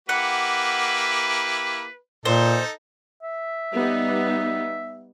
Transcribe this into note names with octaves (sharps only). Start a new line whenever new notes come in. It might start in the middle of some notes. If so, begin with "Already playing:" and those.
A#3 E4 G4 B4 F#5
A#2 D#4 A4 C5
E5
G3 B3 D#4